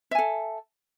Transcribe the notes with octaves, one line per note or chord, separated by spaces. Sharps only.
A4 E5 G#5